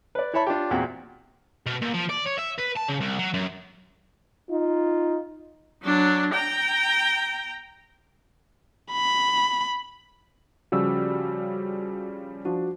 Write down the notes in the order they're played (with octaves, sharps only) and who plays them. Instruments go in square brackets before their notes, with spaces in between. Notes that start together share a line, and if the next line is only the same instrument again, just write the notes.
[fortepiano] B4 D5
E4 C#5 E5 A5 B5
D4 F4 G4
E2 A#2 C4 F#4 G5
[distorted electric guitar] B2
A#2
F3
D5
C#5
E5
B4
A5
C#3
C2
F#3
F#2
[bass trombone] D#4 [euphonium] F4
[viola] F#3 D4
G5 A#5
[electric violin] B5
[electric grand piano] C#3 F3 G3 [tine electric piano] F#4 E6
[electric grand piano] F3 D4 [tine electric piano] F#4